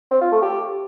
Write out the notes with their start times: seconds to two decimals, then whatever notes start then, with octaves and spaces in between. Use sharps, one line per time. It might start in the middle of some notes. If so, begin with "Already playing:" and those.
0.11 C4
0.21 F4
0.32 A3
0.42 G4